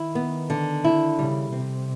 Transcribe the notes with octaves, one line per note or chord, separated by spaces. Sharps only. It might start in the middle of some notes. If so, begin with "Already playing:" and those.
Already playing: D#3 E4
B3
D3
E4
C#3 G3
C3 C4